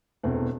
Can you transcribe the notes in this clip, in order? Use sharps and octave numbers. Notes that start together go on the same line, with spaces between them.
E1 E2 B2 A3 C4